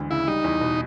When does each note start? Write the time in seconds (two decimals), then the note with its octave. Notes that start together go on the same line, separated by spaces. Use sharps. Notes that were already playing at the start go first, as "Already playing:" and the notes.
Already playing: D2 E3 G#3
0.10 C#3 E4
0.27 G3 D#4
0.44 E2
0.61 B2